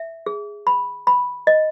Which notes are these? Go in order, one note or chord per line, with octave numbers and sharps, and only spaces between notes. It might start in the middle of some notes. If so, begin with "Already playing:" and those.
Already playing: E5
G#4
B5
B5
D#5